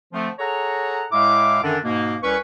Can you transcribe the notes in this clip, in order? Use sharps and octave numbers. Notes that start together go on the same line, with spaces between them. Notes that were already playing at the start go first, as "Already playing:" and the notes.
D3 F3 A3 C4
G#4 A4 C#5 F#5 A#5
A2 G#3 E4 F5 D6
F#2 D3 D#3 D4
G#2 B2 A#3
C2 C#4 B4 C#6